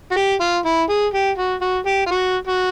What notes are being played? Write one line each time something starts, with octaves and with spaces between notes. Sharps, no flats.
F#4
G4
F4
E4
G#4
G4
F#4
F#4
G4
F4
F#4
F#4